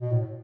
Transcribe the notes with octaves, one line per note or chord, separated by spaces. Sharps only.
B2
A2